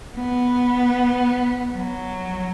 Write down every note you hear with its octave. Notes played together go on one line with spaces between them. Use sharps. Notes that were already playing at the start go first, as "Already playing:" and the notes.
B3
F#3